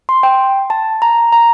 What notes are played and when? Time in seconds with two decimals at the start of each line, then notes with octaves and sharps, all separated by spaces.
0.09 C6
0.23 G5
0.70 A5
1.02 A#5
1.32 A#5